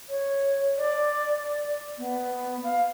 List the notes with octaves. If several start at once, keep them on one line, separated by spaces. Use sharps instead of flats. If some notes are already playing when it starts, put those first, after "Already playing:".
C#5
D5
B3
F5